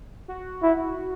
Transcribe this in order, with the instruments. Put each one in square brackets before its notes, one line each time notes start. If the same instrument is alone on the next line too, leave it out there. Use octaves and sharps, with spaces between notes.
[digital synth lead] F#4
[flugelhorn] E4